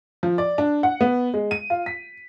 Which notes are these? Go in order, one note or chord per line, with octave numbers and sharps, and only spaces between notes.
F3
D5
D4
F#5
B3
G#3
D#7
F4
B6